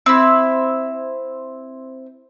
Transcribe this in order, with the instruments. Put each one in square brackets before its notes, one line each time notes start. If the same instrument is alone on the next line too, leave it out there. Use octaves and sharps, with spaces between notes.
[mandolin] C4 E4